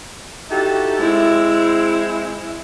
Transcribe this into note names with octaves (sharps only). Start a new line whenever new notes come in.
D#4 E4 F#4 G4 A4
G#3 C4 E4